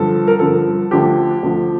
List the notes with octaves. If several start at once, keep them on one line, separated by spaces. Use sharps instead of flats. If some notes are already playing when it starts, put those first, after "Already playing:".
Already playing: G2 D3 F3 A4
A#4
G2 D3 F3 A4
D2 D3 F3 G4
D2 D3 F3